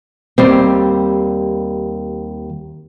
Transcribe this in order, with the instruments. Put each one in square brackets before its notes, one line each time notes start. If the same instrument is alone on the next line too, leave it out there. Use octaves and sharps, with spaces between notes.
[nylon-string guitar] D#2 G3 C4